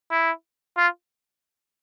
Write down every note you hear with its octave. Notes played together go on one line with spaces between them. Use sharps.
E4
F4